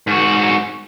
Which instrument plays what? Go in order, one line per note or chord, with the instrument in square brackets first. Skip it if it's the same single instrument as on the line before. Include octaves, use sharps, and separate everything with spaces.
[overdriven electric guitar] G#2 F#4